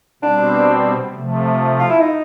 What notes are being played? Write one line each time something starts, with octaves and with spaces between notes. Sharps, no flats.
B2 G3 C4 D4
C3 F3 A3
F4
E4
D#4